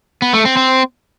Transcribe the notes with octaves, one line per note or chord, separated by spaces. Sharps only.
B3
A3
C4
C4